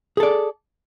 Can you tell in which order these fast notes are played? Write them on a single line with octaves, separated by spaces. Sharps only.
G#4 A4 D5